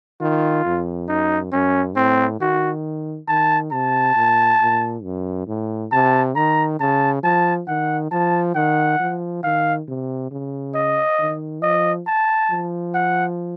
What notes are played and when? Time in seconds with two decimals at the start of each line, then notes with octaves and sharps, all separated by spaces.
0.20 D#3 F4
0.65 F2
1.08 F#2 D#4
1.52 F#2 C#4
1.96 A2 C4
2.40 D#3 F#4
3.28 D#3 A5
3.71 C3 A5
4.15 A#2
4.60 A#2
5.03 F#2
5.47 A2
5.91 C3 A5
6.35 D#3 A#5
6.80 C#3 A5
7.23 F3 A5
7.67 D#3 F#5
8.11 F3 A5
8.55 D#3 F#5
9.00 F3
9.43 D#3 F5
9.87 C3
10.31 C#3
10.75 D#5
11.19 D#3
11.62 F3 D#5
12.06 A5
12.51 F3
12.94 F#5